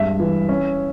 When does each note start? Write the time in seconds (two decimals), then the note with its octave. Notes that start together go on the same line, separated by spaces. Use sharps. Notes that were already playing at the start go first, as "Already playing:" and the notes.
Already playing: G2 G#3 E5
0.20 E3
0.49 C#4